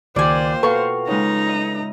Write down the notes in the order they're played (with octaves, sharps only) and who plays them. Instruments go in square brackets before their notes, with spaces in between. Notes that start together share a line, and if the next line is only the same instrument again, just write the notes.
[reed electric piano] C#2 D#3 [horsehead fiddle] A#3 C5 [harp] F4 G4 [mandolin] D5 G#5
[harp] B2 [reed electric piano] A4 B4 [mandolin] F5 C#6
[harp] C#3 G#3 [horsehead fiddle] D#4 A#5
[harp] D#5 E5